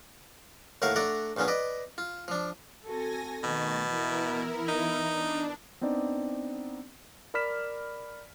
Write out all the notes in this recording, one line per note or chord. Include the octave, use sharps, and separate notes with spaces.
D#2 A2 A#4 F5 F#5 C#6
A3 D4 D5 F#5 A#5
A#1 A#2 B3 C#4 F4
B4 D5 D#5
F4
F3 D4
C4 F#4 A4 G#5 A#6
B2 D#3 A3 A6
E3 B3 E4 A#4
D#4
D4
B3 C4 D4 D#4 D5
A#4 D5 B5 F6 B6 E7